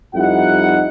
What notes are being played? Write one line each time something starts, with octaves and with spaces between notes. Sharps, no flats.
F2 G3 D#4 E4 F#5